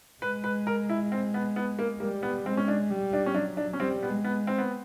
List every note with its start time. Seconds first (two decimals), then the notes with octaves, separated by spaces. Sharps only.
0.22 G#3 B4
0.44 B4
0.67 A#4
0.89 E4
1.12 C4
1.34 B3
1.56 B3
1.79 A#3
2.00 G3 A#3
2.23 B3
2.45 G#3 C4
2.57 C#4
2.68 D4
2.90 G3
3.13 D4
3.26 C#4
3.34 F#3 D4
3.57 D4
3.73 C#4
3.80 G3 C4
4.03 B3
4.09 G#3
4.24 B3
4.47 C4
4.58 B3